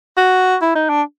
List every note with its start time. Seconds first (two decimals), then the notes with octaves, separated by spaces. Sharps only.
0.17 F#4
0.62 E4
0.75 D#4
0.89 D4